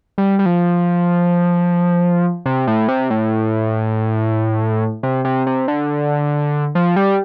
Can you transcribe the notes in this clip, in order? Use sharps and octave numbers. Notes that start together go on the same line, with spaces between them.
G3
G3
F3
C3
A2
C3
A2
C3
C3
C3
D3
F3
G3